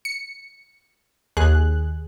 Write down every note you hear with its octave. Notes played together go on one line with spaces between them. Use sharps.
C#7
D#2 G#4 F#6